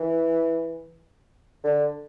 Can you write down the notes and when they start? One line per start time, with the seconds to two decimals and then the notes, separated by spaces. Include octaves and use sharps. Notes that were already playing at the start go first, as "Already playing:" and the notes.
Already playing: E3
1.64 D3